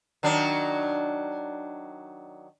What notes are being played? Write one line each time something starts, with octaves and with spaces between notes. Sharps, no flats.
D#3 F#3 D4